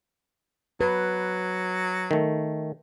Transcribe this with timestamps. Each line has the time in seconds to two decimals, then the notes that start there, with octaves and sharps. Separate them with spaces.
0.81 F#3 B4
2.11 D#3 A3